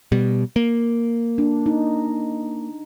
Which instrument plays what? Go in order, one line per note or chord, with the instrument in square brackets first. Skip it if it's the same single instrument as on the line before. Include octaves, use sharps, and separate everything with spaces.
[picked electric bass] B2 G3
A#3
[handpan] D4
D#4